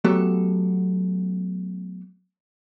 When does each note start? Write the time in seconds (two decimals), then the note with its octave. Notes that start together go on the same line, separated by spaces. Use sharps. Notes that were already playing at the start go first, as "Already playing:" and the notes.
0.04 F#3 A3 B3 G4 A4